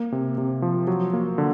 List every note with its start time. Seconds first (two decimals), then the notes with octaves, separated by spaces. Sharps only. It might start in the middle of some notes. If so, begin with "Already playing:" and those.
Already playing: A#3
0.12 C3
0.38 C3
0.62 F3
0.87 F#3
1.13 A#3
1.38 D3